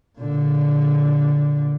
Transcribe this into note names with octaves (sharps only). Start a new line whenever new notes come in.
A#2 D3